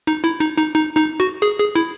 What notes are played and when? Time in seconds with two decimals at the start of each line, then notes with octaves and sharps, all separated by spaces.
0.07 D#4
0.24 E4
0.40 D#4
0.58 D#4
0.74 D#4
0.97 D#4
1.20 F#4
1.42 G#4
1.59 G#4
1.75 E4